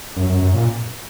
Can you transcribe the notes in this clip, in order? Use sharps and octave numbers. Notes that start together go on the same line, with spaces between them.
F#2
F#2
F#2
A#2